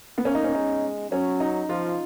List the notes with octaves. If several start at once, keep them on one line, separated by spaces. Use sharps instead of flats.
B3
A#3 C#4
D#4
C#4
G#3 D#4
F#3 C#4
D#4
F3 F4